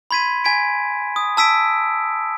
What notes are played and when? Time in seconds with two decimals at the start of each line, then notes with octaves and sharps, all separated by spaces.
0.11 B5 C6 G#6 B6 D#7
0.44 G#5 G#6 B6 D7
1.16 D#6
1.37 A5 E6 B6 D7